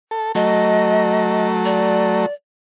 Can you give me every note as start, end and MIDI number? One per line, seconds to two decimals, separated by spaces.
0.11 0.32 69
0.35 2.26 54
0.35 2.26 57
0.35 1.48 75
1.65 2.33 74